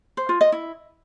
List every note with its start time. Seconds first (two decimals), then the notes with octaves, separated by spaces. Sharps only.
0.17 C5
0.29 F4
0.41 D#5
0.52 E4